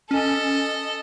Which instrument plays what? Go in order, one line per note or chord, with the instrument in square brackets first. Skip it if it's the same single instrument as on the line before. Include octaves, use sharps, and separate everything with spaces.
[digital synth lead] C#4 [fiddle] A4 D#5